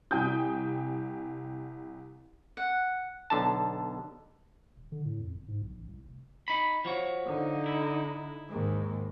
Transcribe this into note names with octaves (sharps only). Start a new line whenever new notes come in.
C2 G5 G#5 D#6 G6
F#5
B1 D3 A5
D#1
D3
A2
F2
F#1
G#2
B1
A1
C2
F1
D#4 B5
F3 F#4 C#5
D3 D#4
E4
D#2 G#2